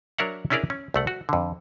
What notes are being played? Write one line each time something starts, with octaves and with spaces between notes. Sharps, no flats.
F#3 D4 A#4 C#5 E5 F#5
C#4 D4 E4 G#4 A#4 D5
C#4
C2 A3 F#5
F#4
F2 D3